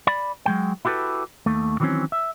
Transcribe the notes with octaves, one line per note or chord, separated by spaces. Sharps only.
D5 B5
F#3 G#3 G5
E4 F#4 G4 A4 B4
D#2 A3
D#3 E3 F#3 G3 C4 C#4
E5